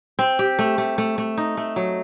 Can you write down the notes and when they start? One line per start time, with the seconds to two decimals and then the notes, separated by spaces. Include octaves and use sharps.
0.19 C4
0.39 G4
0.59 A3
0.78 A3
0.98 A3
1.18 A3
1.37 D#4
1.57 A3
1.76 F#3